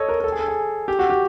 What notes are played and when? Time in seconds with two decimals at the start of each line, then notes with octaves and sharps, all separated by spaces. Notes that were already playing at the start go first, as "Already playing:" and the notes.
Already playing: A4 C#5 D#5
0.09 A#4
0.20 A#4
0.24 A4
0.32 G#4
0.40 A4
0.48 G#4
0.88 G4
0.99 F#4
1.10 G4